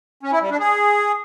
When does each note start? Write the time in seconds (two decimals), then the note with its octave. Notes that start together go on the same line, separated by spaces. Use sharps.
0.23 C#4
0.32 E4
0.41 G3
0.51 D4
0.60 G#4